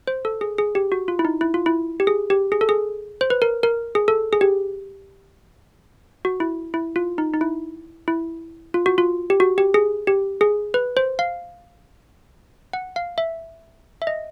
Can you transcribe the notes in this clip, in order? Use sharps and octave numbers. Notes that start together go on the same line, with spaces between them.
C5
A4
G#4
G#4
G4
F#4
F4
E4
D#4
E4
F4
E4
G4
G#4
G4
G#4
A4
G#4
C5
B4
A#4
A#4
G#4
A4
G#4
G4
F#4
E4
E4
F4
D#4
D#4
E4
E4
F4
F#4
F4
G4
F#4
G4
G#4
G4
G#4
B4
C5
F5
F#5
F5
E5
E5
D#5